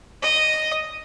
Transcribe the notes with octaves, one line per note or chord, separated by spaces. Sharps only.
D#5